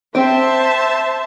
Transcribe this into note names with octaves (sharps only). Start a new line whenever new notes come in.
C4 C5 E5 G5 A5